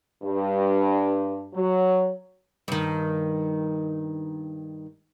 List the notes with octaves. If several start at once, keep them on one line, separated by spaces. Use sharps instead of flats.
G2
F#3
G2 D#3